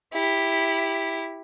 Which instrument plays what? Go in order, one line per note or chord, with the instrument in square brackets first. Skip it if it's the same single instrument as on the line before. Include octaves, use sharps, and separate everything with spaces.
[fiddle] E4 G4